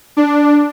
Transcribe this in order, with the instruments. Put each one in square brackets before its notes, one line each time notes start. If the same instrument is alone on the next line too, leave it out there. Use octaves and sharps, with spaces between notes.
[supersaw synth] D4